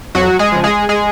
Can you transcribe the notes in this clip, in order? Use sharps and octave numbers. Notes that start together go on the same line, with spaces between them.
F2 F#3 F#4
G#3 G#4
C#3 F3
G#3 G#4
G#3 G#4